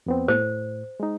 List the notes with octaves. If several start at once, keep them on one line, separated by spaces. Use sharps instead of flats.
F2 B3 C4
A2 C5
G#3 D#4